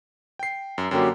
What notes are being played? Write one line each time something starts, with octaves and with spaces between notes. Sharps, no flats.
G5 C7
F#2
F#2 D3 F#3 A#3 G4